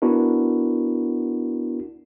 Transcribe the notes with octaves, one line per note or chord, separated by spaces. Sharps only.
B3 D4 E4 F#4 A#4